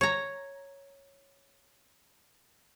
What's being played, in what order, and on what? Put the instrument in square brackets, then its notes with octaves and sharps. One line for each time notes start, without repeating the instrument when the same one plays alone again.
[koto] C#5 A#5